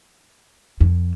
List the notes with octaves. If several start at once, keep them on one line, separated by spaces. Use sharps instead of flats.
F2